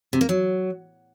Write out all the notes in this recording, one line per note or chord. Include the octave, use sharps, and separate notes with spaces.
C3
A#3
F#3